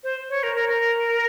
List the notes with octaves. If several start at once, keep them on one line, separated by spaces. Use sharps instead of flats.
C5
C#5
A#4
A#4
A#4